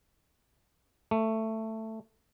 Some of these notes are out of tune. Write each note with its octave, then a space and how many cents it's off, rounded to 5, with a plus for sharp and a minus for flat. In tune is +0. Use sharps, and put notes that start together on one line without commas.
A3 +10